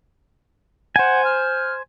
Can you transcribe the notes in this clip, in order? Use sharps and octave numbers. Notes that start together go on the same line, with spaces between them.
C5 F#5 G#5
F6